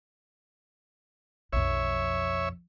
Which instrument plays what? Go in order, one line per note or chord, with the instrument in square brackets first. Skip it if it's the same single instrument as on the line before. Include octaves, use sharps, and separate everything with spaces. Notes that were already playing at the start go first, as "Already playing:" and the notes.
[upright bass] B1 F2 [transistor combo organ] C#5 E5